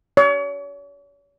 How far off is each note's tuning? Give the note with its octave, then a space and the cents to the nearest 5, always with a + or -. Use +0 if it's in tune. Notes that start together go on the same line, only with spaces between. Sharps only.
C#5 +40